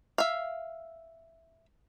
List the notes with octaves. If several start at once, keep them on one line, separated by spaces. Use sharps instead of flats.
E5 F5